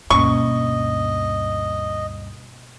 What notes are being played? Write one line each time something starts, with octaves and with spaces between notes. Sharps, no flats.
D2 G2 B2 A#3 C#4 D#5 C#6